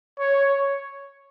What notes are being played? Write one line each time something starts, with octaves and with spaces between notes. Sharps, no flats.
C#5